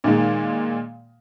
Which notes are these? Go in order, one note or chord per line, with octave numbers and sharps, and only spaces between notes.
A#2 D#3 G#3